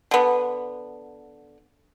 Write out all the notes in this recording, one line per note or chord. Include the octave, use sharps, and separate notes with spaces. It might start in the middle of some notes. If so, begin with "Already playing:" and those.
D3 B3